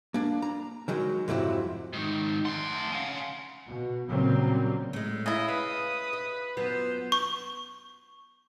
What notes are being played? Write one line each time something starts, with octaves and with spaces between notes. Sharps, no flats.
A#3 D4
A#5
D#3 F#3 G#3
F2 G#2 C3 F#3 E4
G#2 D#3
A3 F#5 G#5 C6
C#4 F5
B2
A#2 C#3 F#3 G3 A#3 C4
A2 G#3
C#3 E4 D#5
B4 F5 D#6
D#5
F#2 B3 F4 C5
C#6